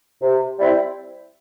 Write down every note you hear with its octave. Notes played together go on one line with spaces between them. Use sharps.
C3
G3 C4 E4